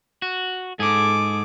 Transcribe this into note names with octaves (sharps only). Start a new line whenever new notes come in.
F#4
G#2 G#4 A4 D6